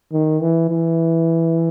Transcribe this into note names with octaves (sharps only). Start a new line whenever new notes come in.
D#3
E3
E3